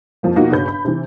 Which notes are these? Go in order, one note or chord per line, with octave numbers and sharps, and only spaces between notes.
F2 F3 A#3
B2 F3 A#3 D#4 F#4
G1 C#3 C#4 B4 B5 G6
B5
C3 E3